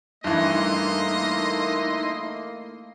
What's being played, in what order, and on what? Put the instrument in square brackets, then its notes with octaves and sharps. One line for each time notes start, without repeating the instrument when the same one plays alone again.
[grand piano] G2 E3 [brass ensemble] A3 A#3 [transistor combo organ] D#4 E4 C6 [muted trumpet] D#5